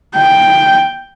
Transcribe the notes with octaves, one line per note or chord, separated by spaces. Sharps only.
G5